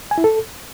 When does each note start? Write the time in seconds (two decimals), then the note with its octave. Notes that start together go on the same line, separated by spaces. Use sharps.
0.11 G#5
0.18 E4
0.24 A4